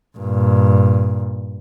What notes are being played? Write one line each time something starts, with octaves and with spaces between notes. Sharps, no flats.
G2 A#2